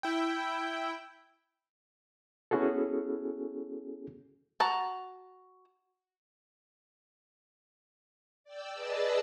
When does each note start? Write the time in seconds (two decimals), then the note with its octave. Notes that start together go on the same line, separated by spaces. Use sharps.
0.03 E4 G5
2.51 B3 C#4 E4 F#4 G#4 A4
4.60 F#4 A5 A#5
8.44 D5 G5 E6
8.73 G#4 B4 D5 D#5 A5 E6